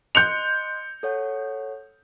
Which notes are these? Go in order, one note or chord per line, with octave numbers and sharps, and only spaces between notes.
D#5 C6 F#6 G6 C#7 F7
A4 C#5 F#5